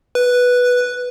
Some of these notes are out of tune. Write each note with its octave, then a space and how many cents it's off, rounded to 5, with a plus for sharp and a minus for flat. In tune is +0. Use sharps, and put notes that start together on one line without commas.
B4 -5